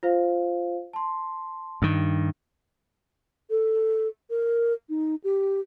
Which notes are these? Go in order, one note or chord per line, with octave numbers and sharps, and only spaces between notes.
F4 C5 F5
A5 C6
G2 D#3
A4
A#4
D#4
G4